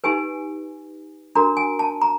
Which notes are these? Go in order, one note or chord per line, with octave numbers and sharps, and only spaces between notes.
D#4 G4 B4 G#5
D4 F#4 A#4 A#5
G#5
A5
A#5